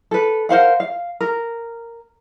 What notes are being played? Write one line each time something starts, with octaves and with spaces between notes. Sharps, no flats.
A4 B4
A#4 C5 F5 F#5
F5
A#4